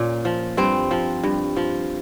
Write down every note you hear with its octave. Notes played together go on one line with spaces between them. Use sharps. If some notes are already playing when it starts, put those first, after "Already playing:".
Already playing: A#2 C#4
F3
G2 C4
F3
G2
F3